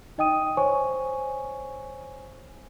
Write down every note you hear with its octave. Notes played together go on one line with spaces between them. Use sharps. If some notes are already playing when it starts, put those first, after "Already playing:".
D#4 D#5 G5 D#6 D#7
C5 C#5 G#5 C#6